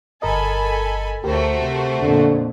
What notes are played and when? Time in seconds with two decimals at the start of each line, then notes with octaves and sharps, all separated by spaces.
0.22 G1 A4 A#4 D#5 G#5 B5
1.24 D2 A3 F#4 G4 A#4 C5
1.59 C3
2.01 F2 A#2 D3